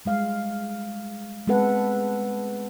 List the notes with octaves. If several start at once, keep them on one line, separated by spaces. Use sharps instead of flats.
G3 G#3 F5
G#3 B3 C4 A4 B4 F#5